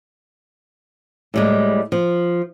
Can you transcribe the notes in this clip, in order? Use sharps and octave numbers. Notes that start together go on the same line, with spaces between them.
A2 G3 G#3
F3